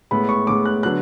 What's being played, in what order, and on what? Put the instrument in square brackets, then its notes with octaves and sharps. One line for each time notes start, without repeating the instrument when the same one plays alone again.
[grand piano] A2 G#3 B3 B5
C#6
A2 G#3 B3 D6
F#6
D3 F#3 B3 F#6